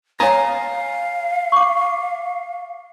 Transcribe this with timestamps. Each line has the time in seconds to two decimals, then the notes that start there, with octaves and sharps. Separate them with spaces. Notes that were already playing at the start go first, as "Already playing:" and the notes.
0.20 C#5 F5 G#5 A#5 D#6
1.52 C#6 D6